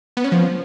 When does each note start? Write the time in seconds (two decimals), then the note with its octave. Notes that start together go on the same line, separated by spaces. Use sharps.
0.17 B3
0.24 C#4
0.32 F3